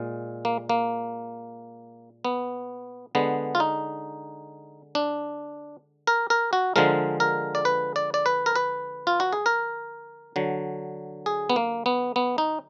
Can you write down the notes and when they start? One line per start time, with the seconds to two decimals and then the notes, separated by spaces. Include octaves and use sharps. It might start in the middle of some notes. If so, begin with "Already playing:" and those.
Already playing: A#2 G#3
0.45 A#3
0.69 A#3
2.25 B3
3.15 D3 G#3 B3
3.55 F4
3.60 D#4
4.95 D4
6.07 A#4
6.30 A#4
6.53 F#4
6.76 D3 F3 G#3 A#4
7.20 A#4
7.55 D5
7.65 B4
7.96 D5
8.14 D5
8.26 B4
8.46 A#4
8.56 B4
9.07 F4
9.20 F#4
9.33 G#4
9.46 A#4
10.36 D3 F#3
11.26 G#4
11.50 B3
11.56 A#3
11.86 B3
12.16 B3
12.38 D#4